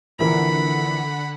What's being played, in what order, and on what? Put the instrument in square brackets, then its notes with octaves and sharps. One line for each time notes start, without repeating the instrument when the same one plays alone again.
[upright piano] A#1 E3 A#4 [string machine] D3 F#5 [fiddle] B5